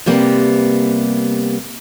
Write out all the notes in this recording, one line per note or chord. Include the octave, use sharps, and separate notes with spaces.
C3 G3 A#3 B3